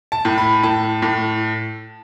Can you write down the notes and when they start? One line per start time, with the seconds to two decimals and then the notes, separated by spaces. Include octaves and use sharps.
0.12 A5
0.25 A2
0.38 B5
0.63 A2 A5
1.02 A2